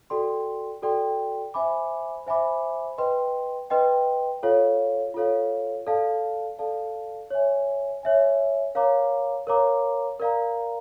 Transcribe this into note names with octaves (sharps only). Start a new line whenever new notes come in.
F#4 A4 D5 G5 C6
F#4 A4 D5 G5 C6
C5 E5 G#5 B5 D6
C5 E5 G#5 B5 D6
B4 D#5 G5 C6
B4 D#5 G5 C6
F4 A4 C#5 F5
F4 A4 C#5 F5
A4 D5 F5 A5
A4 D5 F5 A5
C#5 E5 G#5
C#5 E5 G#5
A#4 C#5 F5 A#5 D6
A#4 C#5 F5 A#5 D6
A#4 D5 F5 A#5